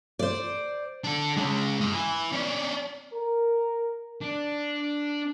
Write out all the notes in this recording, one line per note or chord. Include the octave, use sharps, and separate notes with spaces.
C5 D5
D4 A4
G#3 C#4
G2 D#5
E4 B4
C#4 D4
A#4
D4